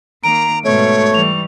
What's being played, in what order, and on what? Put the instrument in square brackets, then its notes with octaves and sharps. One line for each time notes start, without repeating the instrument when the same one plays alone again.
[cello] D#3 A#3 [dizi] A#5 [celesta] D7
[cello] G#2 B2 [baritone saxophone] A3 [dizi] C#5
[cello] E3 G3 [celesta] C#6 F7